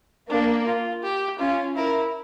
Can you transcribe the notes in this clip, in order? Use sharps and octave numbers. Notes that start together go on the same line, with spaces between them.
A#3 D4
F4
G4
C#4 F4
E4 A#4